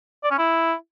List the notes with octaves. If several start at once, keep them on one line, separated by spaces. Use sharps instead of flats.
D5
C#4
E4